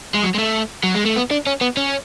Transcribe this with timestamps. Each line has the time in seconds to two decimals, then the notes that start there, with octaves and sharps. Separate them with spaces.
0.15 G#3
0.23 F#3
0.35 G#3
0.39 A3
0.83 F#3
0.95 G#3
1.05 A3
1.16 B3
1.31 D4
1.47 C#4
1.61 B3
1.77 C#4